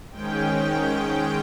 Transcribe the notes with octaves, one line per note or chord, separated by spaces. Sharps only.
G#2 D#3 G#3 C#4 G5